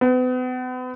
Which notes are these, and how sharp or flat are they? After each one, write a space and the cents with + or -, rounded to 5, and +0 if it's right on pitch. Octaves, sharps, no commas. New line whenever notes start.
B3 +40